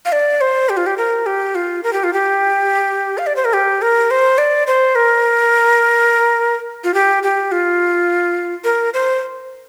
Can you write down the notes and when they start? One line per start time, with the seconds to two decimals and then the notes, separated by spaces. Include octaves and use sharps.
0.05 F5
0.12 D5
0.41 C5
0.69 G4
0.77 F4
0.86 G4
0.97 A#4
1.26 G4
1.55 F4
1.84 A#4
1.93 G4
2.04 F4
2.13 G4
3.18 F5
3.27 D5
3.36 C5
3.45 A#4
3.53 G4
3.82 A#4
4.11 C5
4.38 D5
4.67 C5
4.95 A#4
6.84 F4
6.94 G4
7.23 G4
7.52 F4
8.64 A#4
8.94 C5